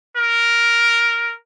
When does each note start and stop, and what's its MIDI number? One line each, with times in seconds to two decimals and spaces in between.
0.17 1.35 70